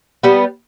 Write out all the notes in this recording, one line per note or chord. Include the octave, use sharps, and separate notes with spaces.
G3 B3